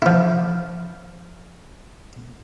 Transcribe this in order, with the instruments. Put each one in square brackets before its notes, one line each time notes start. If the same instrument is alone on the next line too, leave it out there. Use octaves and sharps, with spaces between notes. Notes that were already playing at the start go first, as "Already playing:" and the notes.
[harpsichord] F3 E4